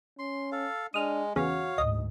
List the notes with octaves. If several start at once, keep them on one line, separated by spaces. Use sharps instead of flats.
C#4 C6
A4 F5
G#3 D4 D#6 F6
E2 C#3 F#4 C#5 F5
D2 G#2 D#5